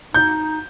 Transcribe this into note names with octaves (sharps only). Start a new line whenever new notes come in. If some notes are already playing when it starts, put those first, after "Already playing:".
D#4 G6